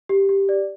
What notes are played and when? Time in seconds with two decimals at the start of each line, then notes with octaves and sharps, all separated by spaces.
0.09 G4
0.29 G4
0.49 D5